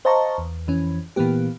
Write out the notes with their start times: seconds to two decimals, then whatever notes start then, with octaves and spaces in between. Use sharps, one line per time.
0.05 C5 D#5 F5 A5 A#5 C#6
0.38 E2
0.67 F2 E3 C#4
1.16 A#2 E3 A#3 B3 G4